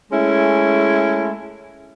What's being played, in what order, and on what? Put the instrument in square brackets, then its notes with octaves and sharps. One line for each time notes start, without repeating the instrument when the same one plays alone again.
[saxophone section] G#3 A3 C#4 E4